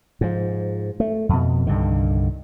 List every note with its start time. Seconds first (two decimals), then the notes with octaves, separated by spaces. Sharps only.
0.21 G#2 F3
1.00 A3
1.29 F2 B2
1.67 C2 G2 D3 D#3